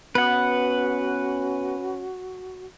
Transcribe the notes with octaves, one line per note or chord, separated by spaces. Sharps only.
B3 C#4 F#4 B4 F#5